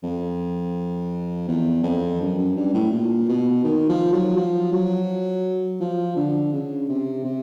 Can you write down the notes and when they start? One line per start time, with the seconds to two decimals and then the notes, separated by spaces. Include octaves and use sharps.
0.03 F2
1.48 E2
1.83 F2
2.21 F#2
2.38 F#2
2.56 G2
2.74 A2
2.92 A#2
3.29 B2
3.64 D#3
3.89 F3
4.12 F#3
4.37 F3
4.72 F#3
5.80 F3
6.16 D3
6.53 C#3
6.89 C3
7.24 C3